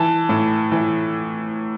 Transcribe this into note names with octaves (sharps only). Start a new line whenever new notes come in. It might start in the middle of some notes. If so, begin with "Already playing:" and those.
Already playing: E3 A5
A2
E3